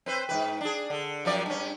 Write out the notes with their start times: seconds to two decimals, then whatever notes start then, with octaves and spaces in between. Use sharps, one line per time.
0.06 C4 B4 C5
0.29 G#2 D#3 B4
0.61 D4 G#4
0.90 D3
1.25 F#2 F3 D5
1.46 G2 C#4